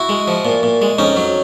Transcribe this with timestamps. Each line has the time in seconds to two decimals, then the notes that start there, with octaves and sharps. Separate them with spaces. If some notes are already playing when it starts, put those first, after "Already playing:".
Already playing: E4 F#4
0.09 G#3
0.28 F3
0.45 A#2
0.63 A#2
0.82 G#3
0.98 F2 C#4 D#4
1.17 F#3